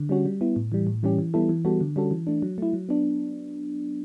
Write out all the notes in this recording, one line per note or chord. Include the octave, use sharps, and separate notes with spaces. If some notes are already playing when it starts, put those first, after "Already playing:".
Already playing: D3
G3 C#4 F#4
G3
B3 E4
A2
E3 G3
A2
E3 G3 C#4 G4
E3
G3 B3 E4 A4
E3
G3 B3 F#4 A4
D3
G3 C#4 F#4 A4
E3
A3 D4
F#3
A3 E4
F#3
B3 D4